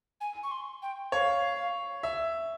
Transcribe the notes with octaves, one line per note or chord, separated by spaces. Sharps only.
G#5
C#6
C6
G5
C#5 F5
E5